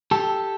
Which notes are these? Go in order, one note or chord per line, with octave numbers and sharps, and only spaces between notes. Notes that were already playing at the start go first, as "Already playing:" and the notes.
G4 A4